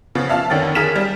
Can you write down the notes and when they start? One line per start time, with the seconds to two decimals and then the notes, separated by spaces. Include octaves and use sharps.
0.15 C#3 F3 B3
0.29 E5 F5 A5 F6
0.50 F2 D3 D#3 C#4 G5 A6
0.75 G#4 A#4 F6 B6 E7 F7
0.96 G3